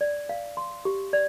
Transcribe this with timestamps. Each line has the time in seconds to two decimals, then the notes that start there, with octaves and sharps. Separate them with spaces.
0.01 D5
0.29 F5
0.57 C6
0.85 G4
1.13 D5